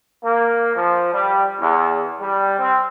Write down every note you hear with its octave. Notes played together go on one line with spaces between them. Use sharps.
A#3
F3
G3
E2
G3
C4